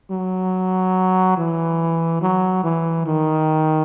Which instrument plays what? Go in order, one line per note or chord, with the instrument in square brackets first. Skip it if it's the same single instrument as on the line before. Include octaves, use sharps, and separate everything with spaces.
[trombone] F#3
E3
F#3
E3
D#3